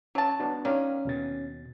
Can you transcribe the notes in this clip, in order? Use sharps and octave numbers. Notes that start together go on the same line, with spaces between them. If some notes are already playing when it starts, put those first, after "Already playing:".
F#3 C#4 A5
B3 D4 F#4
D#3 C#4 D5 F5
D#2 B2 A6